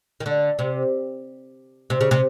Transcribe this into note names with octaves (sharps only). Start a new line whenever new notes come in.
D#3
D3
C3
C3
C#3
C3